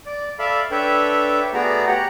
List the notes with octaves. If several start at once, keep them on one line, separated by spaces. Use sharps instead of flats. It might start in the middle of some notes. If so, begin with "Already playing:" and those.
D5
A4 D5 E5 F5 B5
D4 A4 B4 C#5 E5 G5
A3 B3 F#4 G#4 D5 A#5
G4 C#5 F#5 A#5